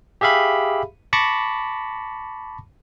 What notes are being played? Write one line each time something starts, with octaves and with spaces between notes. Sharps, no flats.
G4 G#4 E5 F5 B5
A5 B5 C#6 D6 A#6 C#7